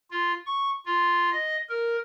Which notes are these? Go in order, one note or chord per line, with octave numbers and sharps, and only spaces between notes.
F4
C#6
F4
D#5
A#4